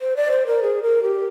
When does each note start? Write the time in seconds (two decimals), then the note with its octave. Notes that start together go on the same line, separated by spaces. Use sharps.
0.01 C5
0.16 D5
0.31 C5
0.47 A#4
0.63 G#4
0.83 A#4
1.03 G4